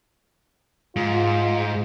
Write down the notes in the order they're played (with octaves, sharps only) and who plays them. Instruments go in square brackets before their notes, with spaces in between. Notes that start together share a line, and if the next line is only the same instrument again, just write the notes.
[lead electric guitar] G#2 [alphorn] F4